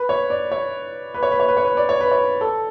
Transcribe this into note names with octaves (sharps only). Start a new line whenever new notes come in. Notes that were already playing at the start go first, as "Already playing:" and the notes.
Already playing: B4
C#5
D5
C#5
B4
C#5
B4
C#5
B4
C#5
B4
D5
C#5
B4
C#5
A4